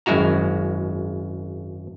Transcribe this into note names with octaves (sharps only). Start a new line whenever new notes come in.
G#1 F#2 G#3 E4 F#4 A#5